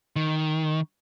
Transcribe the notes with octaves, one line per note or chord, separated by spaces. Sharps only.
D#3